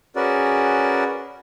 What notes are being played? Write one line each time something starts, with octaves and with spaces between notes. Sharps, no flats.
C#4 F#4 G#4 A#4 B4 D5